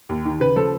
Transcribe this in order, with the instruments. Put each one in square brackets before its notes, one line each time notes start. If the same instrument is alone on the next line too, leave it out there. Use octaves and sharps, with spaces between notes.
[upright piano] D#2
D#3
C#3 B4
F3 A4